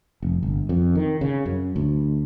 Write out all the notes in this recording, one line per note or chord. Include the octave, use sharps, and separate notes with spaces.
F1
G1
F2
D#3
C#3
F#2
D2